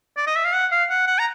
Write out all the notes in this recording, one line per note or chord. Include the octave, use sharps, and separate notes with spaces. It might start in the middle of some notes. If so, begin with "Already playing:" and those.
D5
D#5
E5
F5
F#5
F5
F#5
F#5
A#5